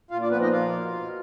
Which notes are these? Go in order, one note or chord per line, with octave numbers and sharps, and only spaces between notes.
A#2 F4 F5
D4 D5
F3 B3 B4
D#4 D#5
A#3 F4 F5
B2
B2